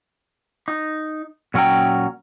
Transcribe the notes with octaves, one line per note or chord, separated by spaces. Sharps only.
D#4
A#2 F#3 C#4 G5 A#5